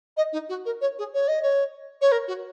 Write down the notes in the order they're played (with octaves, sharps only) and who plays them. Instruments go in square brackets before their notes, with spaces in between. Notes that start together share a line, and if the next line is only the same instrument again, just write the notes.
[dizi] D#5
D#4
F#4
A#4
C#5
G#4
C#5
D#5
C#5
C#5
A#4
F#4